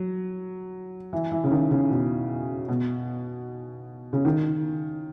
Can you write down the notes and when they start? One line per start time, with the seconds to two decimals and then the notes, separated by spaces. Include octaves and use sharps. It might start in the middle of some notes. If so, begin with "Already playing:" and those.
Already playing: F#3
1.13 E3
1.32 E3
1.44 C#3
1.51 D#3
1.71 C#3
1.90 B2
2.68 B2
4.13 C#3
4.25 D#3